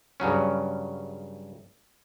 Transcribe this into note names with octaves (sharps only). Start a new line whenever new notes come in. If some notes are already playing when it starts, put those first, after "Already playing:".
G2 C#3 F#3 C#4